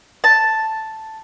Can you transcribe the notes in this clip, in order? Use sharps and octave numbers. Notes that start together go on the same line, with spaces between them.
A5